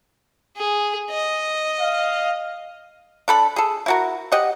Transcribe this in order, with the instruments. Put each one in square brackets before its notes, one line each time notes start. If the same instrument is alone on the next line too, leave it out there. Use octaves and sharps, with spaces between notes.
[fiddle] G#4
D#5
[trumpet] F5
[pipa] D4 A4 B5
G#4 A4
E4 F#4 A#4
G4 D#5 F#5